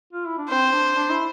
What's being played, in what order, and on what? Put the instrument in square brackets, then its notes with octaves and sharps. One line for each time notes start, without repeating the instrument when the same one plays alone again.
[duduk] F4
E4
D4
[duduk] C4 [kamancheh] C5
[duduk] D4
D4
E4